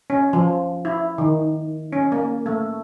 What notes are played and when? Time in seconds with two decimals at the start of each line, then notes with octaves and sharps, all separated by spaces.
0.10 C#4
0.33 F3
0.85 E4
1.18 D#3
1.92 C#4
2.12 A#3
2.46 A3